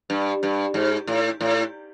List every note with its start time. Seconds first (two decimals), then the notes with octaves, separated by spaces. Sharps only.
0.10 G2
0.43 G2
0.74 G#2
1.07 A2
1.41 A2